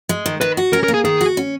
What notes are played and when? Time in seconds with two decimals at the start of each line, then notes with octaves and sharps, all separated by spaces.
0.09 G#3
0.26 D#3
0.41 D#3 B4
0.57 F#4
0.73 C#4 A#4
0.84 A#4
0.88 A#3
0.94 G#4
1.05 D#3 G#4
1.21 F#4
1.37 C#4